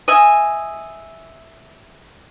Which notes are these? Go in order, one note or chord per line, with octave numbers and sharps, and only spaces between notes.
D#5 E5 G#5